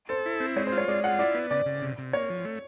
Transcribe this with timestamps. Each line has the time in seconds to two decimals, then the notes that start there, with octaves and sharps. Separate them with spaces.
0.09 A4 C5
0.26 E4
0.40 C4
0.56 G#3 C#5
0.67 C5
0.72 F4
0.78 C#5
0.88 G#3 D5
1.04 F4 F#5
1.19 E4 D5
1.35 B3
1.51 C#3 D5
1.66 C#3
1.82 C3
1.98 C3
2.13 A#3 C#5
2.30 F3
2.45 A3